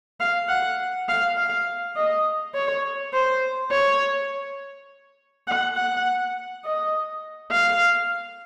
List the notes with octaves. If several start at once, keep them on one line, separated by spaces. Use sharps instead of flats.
F5
F#5
F5
F5
D#5
C#5
C5
C#5
F#5
F#5
D#5
F5